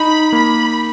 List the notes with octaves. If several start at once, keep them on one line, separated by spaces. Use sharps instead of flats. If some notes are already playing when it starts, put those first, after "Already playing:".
Already playing: D#4 B5
A#3 B5